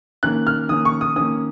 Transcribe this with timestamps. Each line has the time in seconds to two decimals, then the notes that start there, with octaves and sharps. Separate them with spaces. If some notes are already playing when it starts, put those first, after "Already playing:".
0.23 D#3 A#3 C#4 F#6
0.47 F6
0.69 D#3 A#3 C#4 D#6
0.85 C#6
1.01 D#6
1.16 D#3 A#3 C#4 D#6